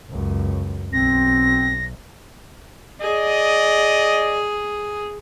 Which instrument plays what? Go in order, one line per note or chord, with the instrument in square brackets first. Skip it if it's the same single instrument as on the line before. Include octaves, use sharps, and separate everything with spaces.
[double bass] C#2 F#2
[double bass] B1 [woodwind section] C4 [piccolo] A#6
[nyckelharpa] G#4 [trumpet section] D5 D#5